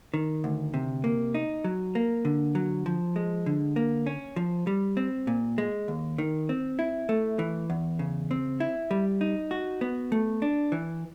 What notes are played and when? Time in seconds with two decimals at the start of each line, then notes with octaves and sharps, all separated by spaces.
0.14 D#3
0.44 D2
0.74 C3
1.04 A#3
1.34 D#4
1.64 F#3
1.95 A#3
2.25 D3
2.55 F#3
2.86 F3
3.16 G#3
3.46 D3
3.76 A#3
4.07 C#4
4.36 F3
4.67 G3
4.97 C4
5.27 A#2
5.58 G#3
5.88 D#2
6.18 D#3
6.49 C4
6.79 E4
7.09 A3
7.39 E3
7.70 E2
7.99 C#3
8.31 C4
8.60 E4
8.91 G3
9.21 D#4
9.51 F#4
9.81 B3
10.12 A3
10.42 D4
10.72 E3